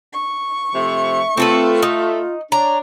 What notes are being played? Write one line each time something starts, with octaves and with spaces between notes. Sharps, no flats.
C#6
C3 F3 A3 E5
A3 C4 F4 A4 B4
D#4
D4 C#5 A#5